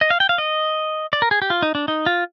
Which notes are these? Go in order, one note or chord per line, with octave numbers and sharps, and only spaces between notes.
D#5
F5
G5
F5
D#5
D5
A#4
G#4
G4
F4
D#4
D4
D#4
F4